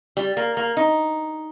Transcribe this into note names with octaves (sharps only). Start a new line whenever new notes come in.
G3
A#3
A#3
D#4